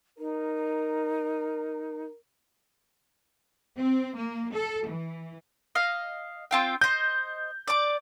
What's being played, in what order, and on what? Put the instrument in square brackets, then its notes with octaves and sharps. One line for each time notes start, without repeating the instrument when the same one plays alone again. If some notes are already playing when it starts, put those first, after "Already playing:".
[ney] D#4 [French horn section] A#4
[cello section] C4
A#3
A4
E3
[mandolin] D#5 F5
C4 F4 G5
[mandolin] C5 D#5 [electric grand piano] G6
[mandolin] D5 D6